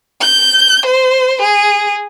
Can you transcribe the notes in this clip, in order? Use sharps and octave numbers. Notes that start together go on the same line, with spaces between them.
G6
C5
G#4